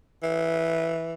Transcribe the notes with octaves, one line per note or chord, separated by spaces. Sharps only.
E3